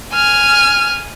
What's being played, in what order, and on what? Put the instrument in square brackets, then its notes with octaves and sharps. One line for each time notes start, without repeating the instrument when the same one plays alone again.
[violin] G#5 F6